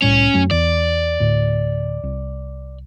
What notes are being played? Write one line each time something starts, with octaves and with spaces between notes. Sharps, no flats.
C2 A2 G3 C#4
F#2 F#3 A3
E2 E3 D5
D2 A2
C2